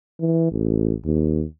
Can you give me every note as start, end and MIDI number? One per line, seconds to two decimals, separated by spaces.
0.20 0.50 52
0.51 0.94 33
1.05 1.44 39